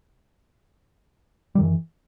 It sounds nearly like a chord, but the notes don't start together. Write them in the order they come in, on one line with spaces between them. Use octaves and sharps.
G3 D#3 F#2 E3